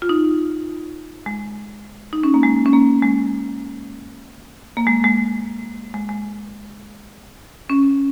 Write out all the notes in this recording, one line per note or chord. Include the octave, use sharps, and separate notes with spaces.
F4
D#4
G#3
D#4
C#4
A#3
G#3
C#4
A#3
G#3
A#3
G#3
G#3
G#3
G#3
C#4